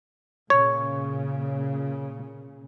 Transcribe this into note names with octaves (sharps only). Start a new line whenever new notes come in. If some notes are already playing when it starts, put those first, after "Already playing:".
A#2 C#3 C#5